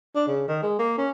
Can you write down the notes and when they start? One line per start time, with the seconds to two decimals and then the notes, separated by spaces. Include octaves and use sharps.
0.15 D4
0.27 C#3
0.48 D#3
0.63 G#3
0.79 A#3
0.98 C#4